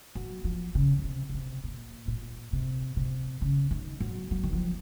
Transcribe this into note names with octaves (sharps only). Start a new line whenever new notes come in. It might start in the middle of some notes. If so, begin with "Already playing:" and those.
F#3
F3
C#3
C#3
C3
C#3
C3
A#2
A#2
C3
C3
C#3
D#3
F#3
F#3
D#3
F3